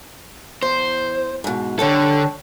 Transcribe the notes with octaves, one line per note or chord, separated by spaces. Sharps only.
E2 C5
G#2 B2
D3 G3 A4 C#5 A5